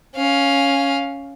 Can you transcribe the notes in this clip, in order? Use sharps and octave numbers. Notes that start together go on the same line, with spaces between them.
C#4 F5